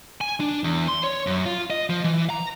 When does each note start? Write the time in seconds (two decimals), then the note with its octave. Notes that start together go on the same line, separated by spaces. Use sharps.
0.21 G#5
0.40 D4
0.64 E2
0.88 C6
1.04 C#5
1.27 F#2
1.46 F4
1.70 D#5
1.90 F3
2.04 E3
2.30 A#5